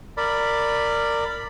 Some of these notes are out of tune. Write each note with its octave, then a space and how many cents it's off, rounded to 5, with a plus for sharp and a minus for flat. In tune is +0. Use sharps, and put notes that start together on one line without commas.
A#4 -15 D5 +5 B5 +0